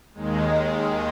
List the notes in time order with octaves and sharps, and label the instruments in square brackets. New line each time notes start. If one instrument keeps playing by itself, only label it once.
[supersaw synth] D#2 D#3 G#3